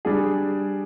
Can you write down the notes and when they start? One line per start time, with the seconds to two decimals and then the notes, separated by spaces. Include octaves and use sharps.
0.05 G3 D4 G#4